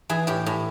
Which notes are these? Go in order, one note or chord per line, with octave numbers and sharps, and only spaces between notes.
E3 G#4
A2 G4
A2